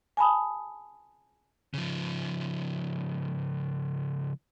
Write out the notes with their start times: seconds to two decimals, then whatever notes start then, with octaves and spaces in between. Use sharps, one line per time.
0.17 G#5 A5 B5 D#6
1.74 C#3 F3